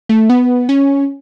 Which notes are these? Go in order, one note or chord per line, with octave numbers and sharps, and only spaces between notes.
A3
B3
C#4